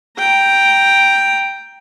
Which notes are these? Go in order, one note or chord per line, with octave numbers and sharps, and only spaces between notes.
G5 A#5